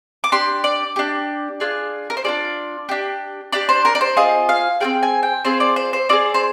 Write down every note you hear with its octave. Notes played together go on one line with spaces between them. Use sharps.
D6
D4 G4 C6
D5
D4 G4
D4 F4 G#4
A#4
C5
D4 F4 G#4 D5
D4 G4
D4 G4 D5
C5
A#4
D5
C5
C4 F4 G#4 D#5
F5
C4 F4 G#4 G5
G#5
G5
C4 F4 G#4 C5
D5
C5
C5
C4 F4 G#4 D5
C5